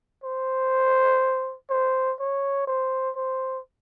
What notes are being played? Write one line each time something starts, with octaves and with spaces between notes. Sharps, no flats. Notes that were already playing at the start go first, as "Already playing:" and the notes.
C5
C5
C#5
C5
C5